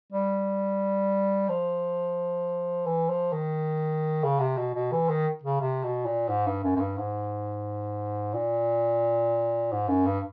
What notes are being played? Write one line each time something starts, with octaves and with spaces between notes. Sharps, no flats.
G3
F3
E3
F3
D#3
C#3
C3
B2
B2
E3
D#3
C#3
C3
B2
A#2
G#2
G2
F#2
F#2
G2
G#2
A#2
G#2
F#2
G2